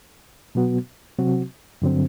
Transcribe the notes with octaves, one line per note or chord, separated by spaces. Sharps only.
B2 F#3 B3 F#4
C3 F#3 C4 F#4
G2 D3 F#3 C4